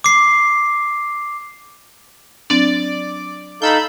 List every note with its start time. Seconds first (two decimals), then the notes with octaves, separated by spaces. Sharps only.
0.04 D6 C7
2.50 F#3 C4 D4 D5 D6
3.62 D#4 A4 F5 B5 E6 G6